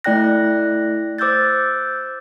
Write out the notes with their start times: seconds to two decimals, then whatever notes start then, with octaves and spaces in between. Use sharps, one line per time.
0.04 A3 E4 D5 G5 F#6 A#6
1.18 C5 D6 E6 F#6 G6 A6